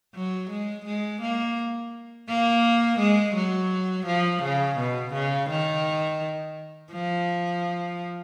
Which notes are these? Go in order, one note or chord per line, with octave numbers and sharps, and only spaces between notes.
F#3
G#3
G#3
A#3
A#3
G#3
F#3
F3
C#3
B2
C#3
D#3
F3